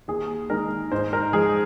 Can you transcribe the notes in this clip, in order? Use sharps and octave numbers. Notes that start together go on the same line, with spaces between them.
D#2 G#4
D#3 G#3 A#4
G#2 C5
A#4
F3 G#3 G#4